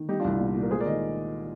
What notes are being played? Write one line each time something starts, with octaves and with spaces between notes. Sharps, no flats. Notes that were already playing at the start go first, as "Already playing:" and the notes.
Already playing: D#3
G3 D#4 G4
D4 F4
C2
A#2
A#2
A#4
G#3 G#4 C5
A#4 D5
D#3 D#5